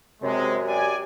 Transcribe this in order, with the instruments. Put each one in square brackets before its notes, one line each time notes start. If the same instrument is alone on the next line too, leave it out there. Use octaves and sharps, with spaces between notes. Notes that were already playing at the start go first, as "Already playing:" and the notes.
[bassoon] F#2 [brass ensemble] C3 G#3
[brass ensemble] G4 D5 G#5